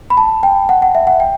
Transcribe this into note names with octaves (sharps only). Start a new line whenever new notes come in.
B5
A5
G5
F#5
F#5
E5
F#5
G5